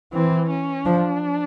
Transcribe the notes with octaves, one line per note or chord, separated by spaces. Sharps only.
E3 C4
C#4
F3 D4